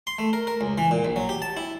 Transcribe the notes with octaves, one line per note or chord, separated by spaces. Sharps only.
C6
A3
A#4
A#4
C#2
E3
A#2
A#1
F#3
G4
A5
E4